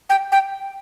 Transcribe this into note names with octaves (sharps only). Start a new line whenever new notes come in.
G5
G5